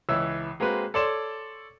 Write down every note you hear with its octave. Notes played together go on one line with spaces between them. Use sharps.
C#2 E3 C#5 E5 E6
G#3 A#3 C4 F#4 B4
A4 C#5 D5 C6 E7